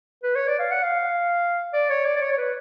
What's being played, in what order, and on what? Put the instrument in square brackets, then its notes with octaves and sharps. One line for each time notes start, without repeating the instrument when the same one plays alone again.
[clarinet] B4
C#5
D5
F5
F#5
F5
D5
C#5
D5
D5
C#5
C#5
B4